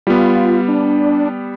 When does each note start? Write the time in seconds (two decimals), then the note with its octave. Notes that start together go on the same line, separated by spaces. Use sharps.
0.07 G3 B3 F4
0.68 D4